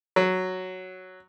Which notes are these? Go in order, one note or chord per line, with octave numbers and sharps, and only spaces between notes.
F#3